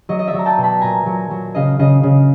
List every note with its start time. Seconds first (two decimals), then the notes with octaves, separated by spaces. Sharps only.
0.09 F#3 D#5
0.19 D#5
0.27 D5 E5
0.34 F#3
0.39 A#5
0.46 G5 A5
0.58 B2
0.63 A5 B5
0.81 A#2 G#5 A#5
1.06 F#3
1.31 F#3
1.55 C#3 D#5 F5
1.79 C#3 D#5
2.03 C#3